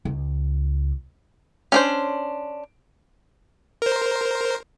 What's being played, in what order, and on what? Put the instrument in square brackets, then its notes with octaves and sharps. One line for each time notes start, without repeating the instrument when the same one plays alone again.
[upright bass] C#2
[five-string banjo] C#4 D4 C5
[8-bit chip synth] A#4 C5